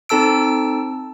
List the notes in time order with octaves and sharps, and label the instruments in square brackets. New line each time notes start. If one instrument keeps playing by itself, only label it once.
[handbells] C4 D#4 A4 A5 E6 D7